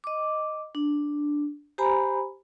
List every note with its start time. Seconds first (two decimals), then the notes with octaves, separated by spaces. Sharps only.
0.04 D#5 D6
0.75 D4
1.78 G4 C5 G#5 A#5 B5